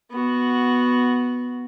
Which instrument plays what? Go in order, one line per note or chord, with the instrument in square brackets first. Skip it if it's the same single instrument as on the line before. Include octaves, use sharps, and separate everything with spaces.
[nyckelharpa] B3 F#4